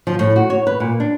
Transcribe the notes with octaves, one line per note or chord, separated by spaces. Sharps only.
F3
A2
F#4
C#5
B4
A#2
D4